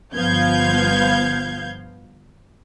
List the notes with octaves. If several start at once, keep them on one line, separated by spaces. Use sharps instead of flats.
G1 F3 B3 F5 G6 G#6